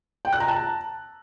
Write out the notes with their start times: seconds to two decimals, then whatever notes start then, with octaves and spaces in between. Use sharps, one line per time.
0.25 G5
0.32 F#6
0.40 A#5
0.48 A5